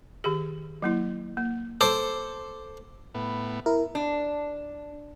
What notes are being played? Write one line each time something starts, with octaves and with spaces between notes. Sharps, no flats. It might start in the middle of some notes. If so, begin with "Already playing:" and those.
D#3 G4 G#4
F#3 A#3 E4
A#3
A4 C5 D6
A2 B3
E4 A#4
D4